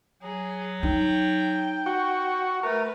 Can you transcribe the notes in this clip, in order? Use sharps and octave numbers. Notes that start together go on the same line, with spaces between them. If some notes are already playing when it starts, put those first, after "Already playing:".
F#3 G#4
D#4 G5
F#4
A3 A#4 B4